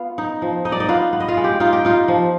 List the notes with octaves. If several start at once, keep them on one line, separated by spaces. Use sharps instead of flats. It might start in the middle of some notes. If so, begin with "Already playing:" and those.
Already playing: B3 F4 F5
D#4
F3
D#4 D#5
D5
D#4 D#5
B3 F4 F5
B3
D#5
F4 F5
G#3
G4
D#4 F4
G4
D#4 F4
F3